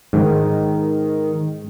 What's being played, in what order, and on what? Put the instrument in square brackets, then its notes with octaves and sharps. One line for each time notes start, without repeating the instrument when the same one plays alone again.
[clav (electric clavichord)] G#2 [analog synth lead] D#3